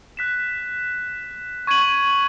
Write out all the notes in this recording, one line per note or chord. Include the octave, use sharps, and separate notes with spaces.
F#6 B6 E7
C#6 G#6 D#7 F#7